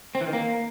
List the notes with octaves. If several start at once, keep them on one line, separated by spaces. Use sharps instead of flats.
C4
E3
D#3
A#3